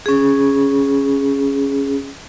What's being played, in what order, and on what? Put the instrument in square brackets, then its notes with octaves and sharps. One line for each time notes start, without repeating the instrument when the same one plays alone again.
[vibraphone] C#4 G#4